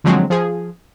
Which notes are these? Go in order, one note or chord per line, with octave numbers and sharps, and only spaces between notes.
D3 F3 F#3 G#3 C4
F3 G#4